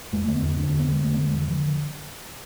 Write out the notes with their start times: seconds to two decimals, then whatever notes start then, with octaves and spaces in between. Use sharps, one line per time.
0.13 E2 G#3
0.24 D3 A3
0.35 B3
0.42 E2 C4
0.57 D3 D4
0.69 E2 C4
0.79 B3
0.88 D3 G#3
1.03 E2 A3
1.14 D3 B3
1.26 G#3
1.33 E2 E3
1.48 D3 F3